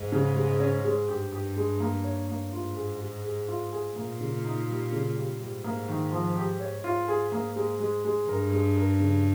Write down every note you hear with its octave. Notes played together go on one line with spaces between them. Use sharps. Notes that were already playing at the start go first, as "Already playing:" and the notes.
Already playing: G#2
C#3
G#3
C#4
G#3
G2 G4
G4
G#3
A#3
C#5
A#3
G#2 F4
G#4
G#3
G#4
F4
G#4
A#2 A#3
C#3
D#4
G3
C#3
G3
G#2 G3
A#3
D#3
F3
G4
C#5
G#2 F4
G#4
A#3
G#3
G#3
G#3
G2 A#4
G#3
A#4
C#3